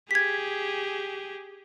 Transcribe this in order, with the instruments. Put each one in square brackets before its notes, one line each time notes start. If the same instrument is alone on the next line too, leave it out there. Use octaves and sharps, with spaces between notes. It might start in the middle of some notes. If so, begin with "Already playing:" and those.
[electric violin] G4 G#4 [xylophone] G#6 B6